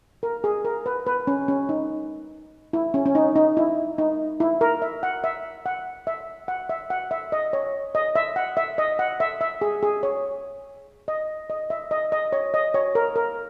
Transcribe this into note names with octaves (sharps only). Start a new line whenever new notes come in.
A#4
G#4
A#4
B4
B4
C#4
C#4
D#4
E4
C#4
C#4
D#4
D#4
E4
D#4
E4
A#4
E5
F#5
E5
F#5
E5
F#5
E5
F#5
E5
D#5
C#5
D#5
E5
F#5
E5
D#5
F#5
E5
E5
G#4
G#4
C#5
D#5
D#5
E5
D#5
D#5
C#5
D#5
C#5
A#4
A#4